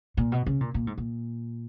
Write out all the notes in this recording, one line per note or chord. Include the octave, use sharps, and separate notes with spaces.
A#2
B2
C#3
A#2
A#2
G#2
A#2